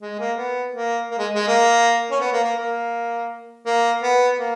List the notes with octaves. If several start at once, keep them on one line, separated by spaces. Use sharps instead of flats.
G#3
A#3
B3
A#3
A#3
G#3
G#3
A#3
C#4
B3
A#3
A#3
A#3
A#3
B3
A#3